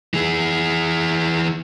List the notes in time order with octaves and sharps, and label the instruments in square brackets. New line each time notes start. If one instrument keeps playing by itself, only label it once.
[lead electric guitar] E3 G#4